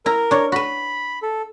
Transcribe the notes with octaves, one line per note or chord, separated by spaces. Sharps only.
E4 A#4 A#5
D4 C#5
F#4 B4 B5
A4